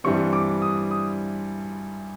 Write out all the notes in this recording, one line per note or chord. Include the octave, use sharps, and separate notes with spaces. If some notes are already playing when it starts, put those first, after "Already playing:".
G2 E3 G3 C4 C#6
D6
D#6
D#6